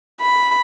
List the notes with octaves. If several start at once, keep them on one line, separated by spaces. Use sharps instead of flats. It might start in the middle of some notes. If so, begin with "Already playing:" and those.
B5